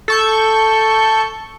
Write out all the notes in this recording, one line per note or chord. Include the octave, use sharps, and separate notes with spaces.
A4 C#6 G6